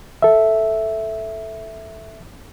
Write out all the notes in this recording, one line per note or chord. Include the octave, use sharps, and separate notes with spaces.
A4 E5